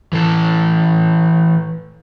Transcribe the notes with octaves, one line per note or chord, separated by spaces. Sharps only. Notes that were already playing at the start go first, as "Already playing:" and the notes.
E3 A4